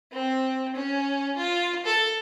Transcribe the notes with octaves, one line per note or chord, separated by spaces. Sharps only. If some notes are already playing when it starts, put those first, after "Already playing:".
C4
C#4
F4
A4